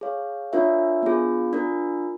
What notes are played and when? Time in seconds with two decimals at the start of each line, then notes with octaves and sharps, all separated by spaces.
0.01 G#4 C#5 F5
0.53 D4 F4 A#4 C#5 E5
1.03 B3 D4 F4 G#4
1.53 D4 F4 A#4